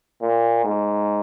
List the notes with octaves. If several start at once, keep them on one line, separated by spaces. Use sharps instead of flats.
A#2
G#2